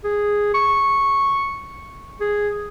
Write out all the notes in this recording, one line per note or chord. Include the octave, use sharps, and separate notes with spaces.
G#4
C#6
G#4